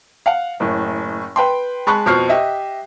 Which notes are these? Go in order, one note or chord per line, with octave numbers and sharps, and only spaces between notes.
F5 F#5
F#1 A2
B4 G5 C6
G#3 A5 B5 C#6 F#6
F2 B2 C5 F6 C7
G4 D#5 E5